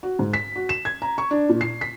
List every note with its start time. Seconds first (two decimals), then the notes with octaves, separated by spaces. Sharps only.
0.03 F#4
0.19 G#2
0.33 B6
0.56 F#4
0.69 E7
0.85 G#6
1.02 A#5
1.18 C#6
1.31 D4
1.49 A#2
1.61 C7
1.81 B6